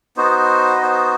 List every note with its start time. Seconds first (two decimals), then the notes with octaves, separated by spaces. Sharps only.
0.17 B3 D#4 F#4 C5
0.75 D#5
0.82 C5